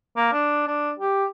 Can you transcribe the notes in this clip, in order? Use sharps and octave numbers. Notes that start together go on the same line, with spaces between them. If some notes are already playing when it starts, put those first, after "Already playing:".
A#3
D4
D4
G4